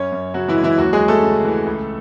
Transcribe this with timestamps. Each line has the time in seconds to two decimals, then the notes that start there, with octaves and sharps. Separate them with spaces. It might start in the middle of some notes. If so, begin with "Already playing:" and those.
Already playing: F#2 C#4 C#5
0.12 F#2
0.34 C#3 F#3 F#4
0.48 E3 E4
0.56 G#3
0.64 E3 E4
0.78 D#2 F#3 F#4
0.93 G#3 G#4
1.00 D#2
1.08 A3 A4
1.23 C#3
1.45 E3
1.66 C#2